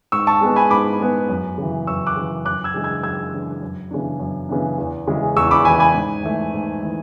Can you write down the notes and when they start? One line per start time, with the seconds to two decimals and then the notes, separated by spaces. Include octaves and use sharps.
0.12 G#2 C#6 E6
0.27 A5 C#6
0.41 G#3 B3
0.56 G#5 B5
0.70 G#2 B5 D6
1.00 G#3 B3
1.29 F#2
1.58 C#3 E3
1.87 F#2 C#6 E6
2.07 D6 F#6
2.16 C#3 E3
2.45 F#2 D6 F#6
2.64 E6 G#6
2.74 C#3 E3 G#3 D4
2.84 E6 G#6
3.03 F#2 E6 G#6
3.33 C#3 E3 G#3 D4
3.62 F#2
3.91 C#3 E3 B3 D4
4.20 F#2
4.49 C#3 E3 B3 D4
4.78 E2
5.07 C#3 E3 G#3
5.36 E2 C#6 E6
5.51 B5 D6
5.65 C#3 E3 G#3 G#5 B5
5.80 G#5 B5
5.95 G#2
6.23 E3 A3
6.53 G#2
6.82 E3 A3